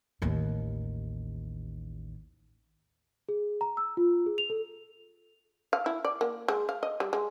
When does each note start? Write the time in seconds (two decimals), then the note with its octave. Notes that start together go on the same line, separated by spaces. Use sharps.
0.22 A1 D#2
3.29 G#4
3.61 A#5
3.77 E6
3.97 F4
4.26 G#4
4.38 F7
4.50 A4
5.73 F5
5.86 E4
6.05 D5
6.21 A#3
6.48 G#3
6.69 F5
6.83 D#5
7.00 G3
7.13 G#3